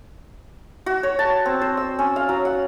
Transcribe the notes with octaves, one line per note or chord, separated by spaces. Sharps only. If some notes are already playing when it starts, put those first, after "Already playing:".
F#4
C#5
A5
C4
C5
E6
C#4
F5
F#3
F#5